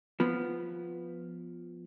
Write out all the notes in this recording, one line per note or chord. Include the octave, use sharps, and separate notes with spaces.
F3 B3